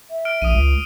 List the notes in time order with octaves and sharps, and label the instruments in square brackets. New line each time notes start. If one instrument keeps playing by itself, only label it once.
[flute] E5
[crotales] F6 D7
[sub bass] A#1 [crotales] D#6 D#7
[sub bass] C#2